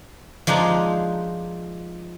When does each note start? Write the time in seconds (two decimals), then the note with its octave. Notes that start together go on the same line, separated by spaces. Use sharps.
0.47 F3 G#3 D4 D#4